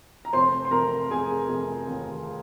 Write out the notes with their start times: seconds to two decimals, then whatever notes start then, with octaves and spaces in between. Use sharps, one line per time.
0.25 A#5
0.33 F1 C5 C6
0.65 C6
0.71 F1 A#4 A#5
1.10 F1 G#4 G#5
1.49 F1
1.88 D#2